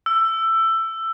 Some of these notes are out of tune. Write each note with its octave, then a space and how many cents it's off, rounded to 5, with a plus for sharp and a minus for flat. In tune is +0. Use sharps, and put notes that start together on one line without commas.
E6 +15